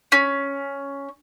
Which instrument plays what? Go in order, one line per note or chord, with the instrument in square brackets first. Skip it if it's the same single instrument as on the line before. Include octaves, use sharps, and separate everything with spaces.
[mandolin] C#4